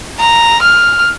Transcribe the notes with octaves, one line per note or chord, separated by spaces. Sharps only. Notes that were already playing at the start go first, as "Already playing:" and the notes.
A#5
F6